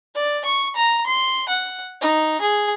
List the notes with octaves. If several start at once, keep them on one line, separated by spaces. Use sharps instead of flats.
D5
C#6
A#5
C6
F#5
D#4
G#4